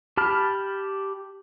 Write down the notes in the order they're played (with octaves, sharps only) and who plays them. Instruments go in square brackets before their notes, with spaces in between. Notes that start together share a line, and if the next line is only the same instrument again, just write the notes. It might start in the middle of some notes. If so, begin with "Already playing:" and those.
[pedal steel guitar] G4 A5 B5 F6